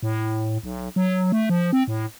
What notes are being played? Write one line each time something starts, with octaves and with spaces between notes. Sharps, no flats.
A2
B1
F#3
A3
F3
C4
A2